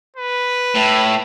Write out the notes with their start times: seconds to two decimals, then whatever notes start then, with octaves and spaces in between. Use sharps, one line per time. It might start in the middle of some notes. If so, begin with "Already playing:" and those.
0.16 B4
0.75 A2